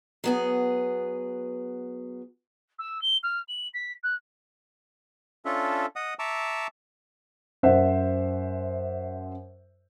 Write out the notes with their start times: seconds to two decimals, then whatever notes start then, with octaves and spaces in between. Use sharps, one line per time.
0.24 F#3 B3 G#4
2.78 E6
3.01 G7
3.23 F6
3.48 F#7
3.73 B6
4.03 F#6
5.45 C#4 D4 F4 A4 E5
5.96 D#5 F#5 D#6
6.19 E5 A5 A#5 C#6 D6 E6
7.63 F#2 C5 E5 F#5